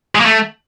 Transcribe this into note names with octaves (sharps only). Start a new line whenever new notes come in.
G#3
A#3
A3